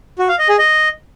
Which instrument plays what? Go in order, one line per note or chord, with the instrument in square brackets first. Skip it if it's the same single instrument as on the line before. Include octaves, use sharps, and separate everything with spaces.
[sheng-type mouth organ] F#4
F5
D#5
G#4
D#5